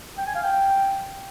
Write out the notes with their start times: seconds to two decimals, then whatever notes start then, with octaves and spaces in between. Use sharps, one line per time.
0.18 G5
0.26 G#5
0.35 F5
0.43 G5